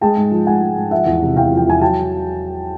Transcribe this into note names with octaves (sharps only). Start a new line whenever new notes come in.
G#3 G5 A5
G#2
F3
G#2 F#5 G#5
G#3
G#2
F3 E5 F#5
E2
C3
E2 F5 G5
F3
G5
E2 G#5
F#3 G5 A5